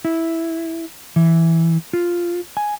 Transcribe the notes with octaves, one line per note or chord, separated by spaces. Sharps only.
E4
E3
F4
G#5